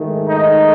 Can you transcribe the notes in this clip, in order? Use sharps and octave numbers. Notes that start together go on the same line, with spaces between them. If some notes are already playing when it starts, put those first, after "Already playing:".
Already playing: G#2 D#3 A3
D#4